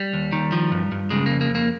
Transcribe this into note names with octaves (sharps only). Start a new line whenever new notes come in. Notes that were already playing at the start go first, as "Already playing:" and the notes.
Already playing: G3
D#2
D#3
F3
G2
G2
C#3 G#3
F2 A#3
A#3
F2
A#3